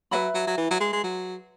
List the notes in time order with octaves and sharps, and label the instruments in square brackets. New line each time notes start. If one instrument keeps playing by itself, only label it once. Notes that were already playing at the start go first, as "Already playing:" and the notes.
[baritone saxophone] F#3 [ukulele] B4 E5 B5
[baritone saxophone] F#3
F#3
E3
F#3
G#3
G#3
F#3